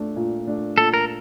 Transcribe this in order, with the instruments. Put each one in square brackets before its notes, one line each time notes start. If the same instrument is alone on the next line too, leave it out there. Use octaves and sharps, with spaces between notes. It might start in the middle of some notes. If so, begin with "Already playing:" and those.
Already playing: [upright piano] A#2 A3 D4
A#2
A3 D4
[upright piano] A#2 [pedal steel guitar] A4
[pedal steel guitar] A#4